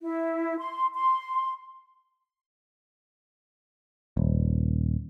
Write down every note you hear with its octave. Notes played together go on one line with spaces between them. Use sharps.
E4
C6
C6
D#1